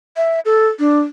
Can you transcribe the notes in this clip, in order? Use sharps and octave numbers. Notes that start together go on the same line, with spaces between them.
E5
A4
D4